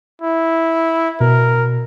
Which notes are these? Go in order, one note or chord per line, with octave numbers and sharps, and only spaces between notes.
E4
B2 A#4